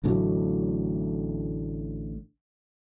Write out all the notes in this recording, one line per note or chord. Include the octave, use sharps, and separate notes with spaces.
A1 A2 D3 F#3